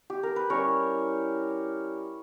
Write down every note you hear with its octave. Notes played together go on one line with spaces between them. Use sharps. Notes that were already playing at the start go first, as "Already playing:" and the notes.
G4
A#4
B4
G3 C#4 E4 A#4 C#5